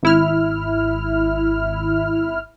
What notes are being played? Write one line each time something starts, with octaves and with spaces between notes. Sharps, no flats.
G#1 E4 F6